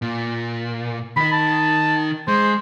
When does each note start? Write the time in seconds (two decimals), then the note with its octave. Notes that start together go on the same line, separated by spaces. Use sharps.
0.02 A#2
1.16 D#3 D#4 B5
1.32 A5
2.28 G#3 C5